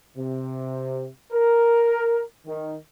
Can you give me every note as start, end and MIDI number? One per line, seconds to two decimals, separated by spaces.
0.17 1.07 48
1.33 2.23 70
2.46 2.76 51